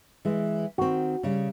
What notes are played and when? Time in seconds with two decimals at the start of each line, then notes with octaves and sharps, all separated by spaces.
0.25 E3 G#3
0.78 D#3 C4 F#4
1.23 C#3 G3